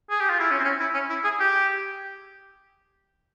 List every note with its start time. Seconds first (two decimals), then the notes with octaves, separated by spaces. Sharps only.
0.10 G#4
0.20 G4
0.30 F4
0.40 E4
0.50 C#4
0.59 C4
0.64 C#4
0.80 E4
0.94 C#4
1.10 E4
1.24 G#4
1.40 G4